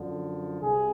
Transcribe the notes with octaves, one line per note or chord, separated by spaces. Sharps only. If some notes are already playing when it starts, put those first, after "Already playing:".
Already playing: F#2 D3 F3
C2 C3 G#4